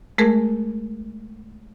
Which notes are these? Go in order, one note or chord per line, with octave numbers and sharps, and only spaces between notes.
G#3 A3 G#4 A#4